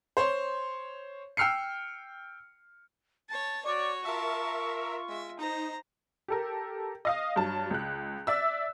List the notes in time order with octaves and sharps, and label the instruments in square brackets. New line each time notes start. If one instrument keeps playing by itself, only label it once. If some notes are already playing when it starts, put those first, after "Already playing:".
[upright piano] C5 C#5 C6
G5 E6 F6 C7 C#7
[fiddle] C#5 A5 [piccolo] A6
[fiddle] F#4 C#5 [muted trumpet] D5 [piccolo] C#6
[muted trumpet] F4 [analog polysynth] A#4 E5 [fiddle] A5
[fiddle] G#3 E5
[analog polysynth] D#4 [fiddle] C5 A#5
[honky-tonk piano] G4 A4 A#4
D#5 F5 D#6
G2 F#3 A5
C#2 F#6
D5 E5 E6